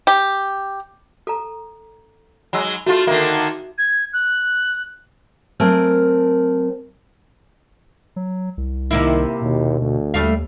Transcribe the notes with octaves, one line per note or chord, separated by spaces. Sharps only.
G4
A4 A#5
F#3 G#3 B5 E6
A3 F4 F#4 G#4
D3 D#3 A#3 E5
G#6
F#6
F#3 A3 C4 A#4 G#5
F#3
C2
C3 D#3 A#3 E4
D#2 B2
D2
D#2 G3 A3 F5